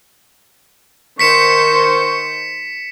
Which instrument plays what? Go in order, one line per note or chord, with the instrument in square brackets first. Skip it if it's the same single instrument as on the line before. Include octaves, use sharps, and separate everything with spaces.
[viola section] D#3 C5 [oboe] C#6 [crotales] B6 C#7 E7